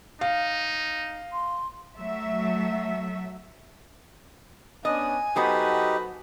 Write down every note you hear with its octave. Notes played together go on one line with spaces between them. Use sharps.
D#4 F5
C6
F#3 A3 E5
B3 C#4 D4 D#5 G#5
F#3 B3 D#4 F#4 G4 A4 B4 C5